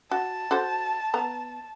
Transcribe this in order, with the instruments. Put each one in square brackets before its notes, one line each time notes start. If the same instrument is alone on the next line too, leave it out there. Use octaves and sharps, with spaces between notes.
[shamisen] F#4 [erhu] A5
[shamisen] F#4 A4 C5
B3 A#5